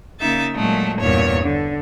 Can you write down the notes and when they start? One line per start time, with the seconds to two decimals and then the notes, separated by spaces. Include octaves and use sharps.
0.20 C#3 A#3 D#4 E5 A6
0.54 A#2 F#3 G#3 A3
1.01 E2 G2 A#2 C#5
1.42 D3